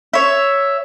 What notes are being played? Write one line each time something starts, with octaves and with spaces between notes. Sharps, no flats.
C#5 E5